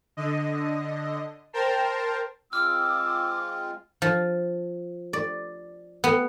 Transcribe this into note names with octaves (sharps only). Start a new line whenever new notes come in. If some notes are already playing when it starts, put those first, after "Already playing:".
D3 D#5
A#4 C5 G5 A5 A#5 C6
G#3 C4 F4 D6 E6 F6
F3
D5
B3